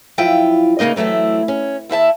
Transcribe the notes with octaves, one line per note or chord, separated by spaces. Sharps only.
F#2 F3 E4 F4 G5
D2 C#3 A#3 D#4 D#5
E3 F#3 A3 C4 E4
C#4
D#2 E4 E5 A5